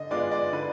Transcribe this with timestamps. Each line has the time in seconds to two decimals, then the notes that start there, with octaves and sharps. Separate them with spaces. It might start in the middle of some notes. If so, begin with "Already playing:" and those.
Already playing: D3 D#5
0.11 G#3 B3 D4 F4 D5
0.32 D5
0.53 D3 B4